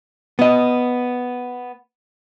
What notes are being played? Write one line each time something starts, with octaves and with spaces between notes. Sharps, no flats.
B3 D#5